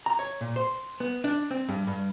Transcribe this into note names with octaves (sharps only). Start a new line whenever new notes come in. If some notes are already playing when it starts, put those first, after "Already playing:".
A#5
C#5
A#2
C5
B3
D4
C4
G2
G2